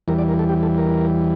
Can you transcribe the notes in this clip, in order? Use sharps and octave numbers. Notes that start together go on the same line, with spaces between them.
E2 E3 G3 A#4
D5
A#4
A4
G4
A4
A#4